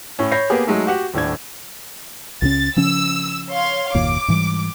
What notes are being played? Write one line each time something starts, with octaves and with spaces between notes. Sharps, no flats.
A2 C#4
C#5 B5 G6 A#6 C7
A#3 B3 G4 G#4 A#4
F#3 G#3 A3 D#4
F#4 G4 F#5
D#1 A2 D4 G#6
C#2 C#3 C#4 A6
C#3 F3 C#4 E6
C#5 F5 C6
F#1 D#2 A#2 D6
G#2 E3 G3